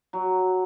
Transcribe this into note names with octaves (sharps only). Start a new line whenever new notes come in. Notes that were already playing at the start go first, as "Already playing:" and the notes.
F#3